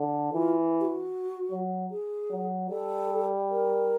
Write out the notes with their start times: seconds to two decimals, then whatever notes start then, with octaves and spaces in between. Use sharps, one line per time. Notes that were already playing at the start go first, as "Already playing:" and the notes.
Already playing: D3
0.32 E3 F4
0.81 G4
0.85 F#4
1.51 F#3
1.91 G#4
2.30 F#3
2.70 G3 A4
3.50 A#4